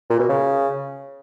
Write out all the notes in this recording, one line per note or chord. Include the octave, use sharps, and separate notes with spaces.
A#2
B2
C#3